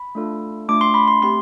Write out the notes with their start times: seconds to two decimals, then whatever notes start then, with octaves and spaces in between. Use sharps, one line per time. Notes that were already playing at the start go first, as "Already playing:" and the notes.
Already playing: B5
0.15 A3 D4 F4 A4
0.68 A3 D4 F4 D6
0.81 C6
0.94 B5
1.08 C6
1.21 A3 C4 G4 C6